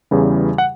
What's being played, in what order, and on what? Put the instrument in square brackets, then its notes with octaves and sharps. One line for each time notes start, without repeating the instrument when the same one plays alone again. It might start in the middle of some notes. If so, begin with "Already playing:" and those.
[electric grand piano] E2 C#3 E3 G3
F#5